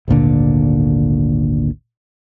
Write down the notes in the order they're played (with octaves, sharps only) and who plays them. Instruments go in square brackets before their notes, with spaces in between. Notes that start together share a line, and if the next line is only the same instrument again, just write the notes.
[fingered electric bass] G#1 D2 A#2 D3